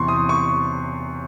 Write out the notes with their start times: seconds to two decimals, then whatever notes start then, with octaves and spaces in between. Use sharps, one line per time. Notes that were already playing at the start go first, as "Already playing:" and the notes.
Already playing: E2 C3 E3 C6 C#6
0.08 D#6
0.29 C#6